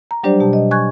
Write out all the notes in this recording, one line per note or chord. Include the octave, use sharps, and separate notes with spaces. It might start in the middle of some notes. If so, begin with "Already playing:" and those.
A#5
F#3 G3 D4 G4 C5 D5
B2 G4 A5
D#5
G#5 C#6 F#6 G#6